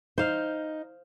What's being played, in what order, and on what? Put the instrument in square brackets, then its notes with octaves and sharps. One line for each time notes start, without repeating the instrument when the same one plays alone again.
[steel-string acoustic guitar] D#4 [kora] C5 F5